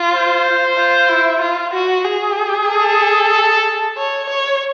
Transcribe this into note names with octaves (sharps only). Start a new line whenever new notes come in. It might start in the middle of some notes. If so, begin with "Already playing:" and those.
Already playing: F4
C5
F4
E4
F4
F#4
G#4
A4
C#5
C#5